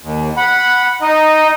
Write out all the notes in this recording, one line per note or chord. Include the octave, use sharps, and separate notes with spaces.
D#2
F#5 B5
D#4 D#5